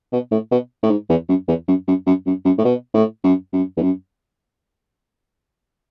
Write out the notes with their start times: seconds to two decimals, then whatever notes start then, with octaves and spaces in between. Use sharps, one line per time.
0.13 B2
0.32 A2
0.52 B2
0.83 A2
0.90 G#2
1.09 E2
1.29 F#2
1.48 E2
1.68 F#2
1.88 F#2
2.07 F#2
2.27 F#2
2.45 F#2
2.58 A2
2.65 B2
2.94 A2
3.24 F#2
3.53 F#2
3.77 E2
3.82 F#2